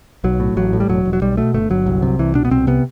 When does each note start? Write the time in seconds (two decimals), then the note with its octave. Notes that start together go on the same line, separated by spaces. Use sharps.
0.24 B1 F#3
0.40 A2
0.57 A1 F#3
0.73 A2
0.80 G3
0.89 E1 F#3
1.05 E1
1.13 F#3
1.22 B1 G3
1.37 B2 A3
1.54 G1 A3
1.70 G1 F#3
1.86 C2
2.02 C3
2.19 C2 E3
2.35 B2 D4
2.45 B3
2.51 C2 C4
2.67 C3 B3